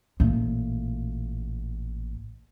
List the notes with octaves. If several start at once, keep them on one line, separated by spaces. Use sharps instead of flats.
A1 A#2